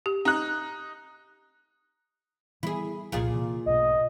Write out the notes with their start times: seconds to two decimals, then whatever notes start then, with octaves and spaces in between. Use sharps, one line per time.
0.06 G4
0.25 D#4 F#6
2.63 E3 G3 B3 E4 G#4
3.12 F1 C2 A#2 F3 F4 G#4
3.33 C3 E3
3.66 B1 G#2 B2 D#5